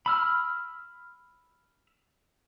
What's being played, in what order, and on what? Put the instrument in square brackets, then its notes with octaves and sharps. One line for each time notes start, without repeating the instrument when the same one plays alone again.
[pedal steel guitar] B5 E6 F6